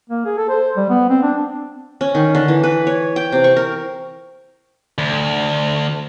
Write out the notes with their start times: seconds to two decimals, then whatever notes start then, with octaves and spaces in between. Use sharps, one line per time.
0.10 A#3
0.25 G#4
0.38 A4
0.49 C5
0.77 G3
0.90 B3
1.09 C4
1.23 D4
2.01 C#4
2.15 D#3
2.35 D3
2.48 E3
2.63 B4
2.87 C#5
3.16 G5
3.32 C3
3.44 C#6
3.56 A#4
4.98 D2